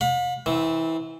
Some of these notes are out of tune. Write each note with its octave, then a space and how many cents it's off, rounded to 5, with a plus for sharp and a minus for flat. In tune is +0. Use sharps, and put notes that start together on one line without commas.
F5 +45 B5 +0
E3 -25 C4 +0